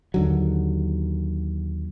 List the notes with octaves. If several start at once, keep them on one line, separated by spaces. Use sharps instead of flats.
D#2 D3 F#3